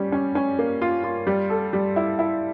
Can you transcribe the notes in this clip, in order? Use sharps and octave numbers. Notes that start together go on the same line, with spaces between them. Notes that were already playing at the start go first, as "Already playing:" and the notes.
Already playing: G3 C#4
C#4
C#4
A#3
F4
F4
G3
A4
G3
E4
E4